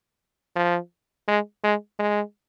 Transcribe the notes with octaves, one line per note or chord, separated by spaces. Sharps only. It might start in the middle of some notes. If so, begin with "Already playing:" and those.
F3
G#3
G#3
G#3